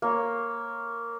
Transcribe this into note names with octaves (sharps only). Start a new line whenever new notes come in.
A#3 C#5